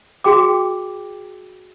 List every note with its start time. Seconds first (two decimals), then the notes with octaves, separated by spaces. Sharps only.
0.24 F#4 G#4 G5 D6